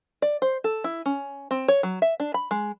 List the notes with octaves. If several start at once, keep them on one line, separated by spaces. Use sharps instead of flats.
D5
C5
A4
E4
C#4
C4
C#5
F#3
E5
D4
B5
G#3